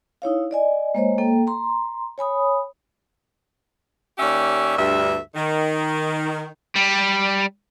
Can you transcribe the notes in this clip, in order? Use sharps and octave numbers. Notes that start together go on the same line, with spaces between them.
D#4 E4 C#5 F5
D5 D#5 G#5
G#3 A#3 C5 C#5 D#5
A#3 A4 G5
A#5 C6
C#5 G#5 B5 D#6
D#2 C#4 G4 C#5 D5 E5
D2 G2 E5
D#3
G3